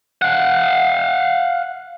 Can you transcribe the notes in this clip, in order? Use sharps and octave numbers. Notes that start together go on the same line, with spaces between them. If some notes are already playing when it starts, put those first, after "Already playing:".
F5 F#5